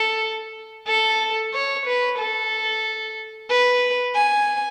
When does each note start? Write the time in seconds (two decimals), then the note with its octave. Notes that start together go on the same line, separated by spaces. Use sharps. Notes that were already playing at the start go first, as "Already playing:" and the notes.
Already playing: A4
0.87 A4
1.53 C#5
1.86 B4
2.19 A4
3.50 B4
4.15 G#5